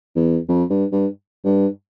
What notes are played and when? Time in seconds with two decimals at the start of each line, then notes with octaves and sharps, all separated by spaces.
0.16 E2
0.49 F2
0.70 G2
0.92 G2
1.44 G2